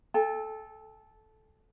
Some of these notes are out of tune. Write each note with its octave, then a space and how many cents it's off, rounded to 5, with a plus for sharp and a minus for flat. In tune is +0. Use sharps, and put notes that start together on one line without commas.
A4 -15 G5 +40